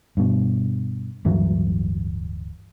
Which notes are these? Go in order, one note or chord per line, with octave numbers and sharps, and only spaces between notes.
G2 B2
D1 G2 E3 F#3